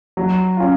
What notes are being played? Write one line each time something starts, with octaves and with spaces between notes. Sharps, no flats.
F#3
C#4 F4